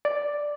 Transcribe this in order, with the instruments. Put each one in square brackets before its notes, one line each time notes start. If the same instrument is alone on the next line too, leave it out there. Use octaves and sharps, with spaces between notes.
[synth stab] D5